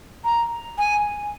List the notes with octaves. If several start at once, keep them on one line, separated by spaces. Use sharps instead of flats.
A#5
G#5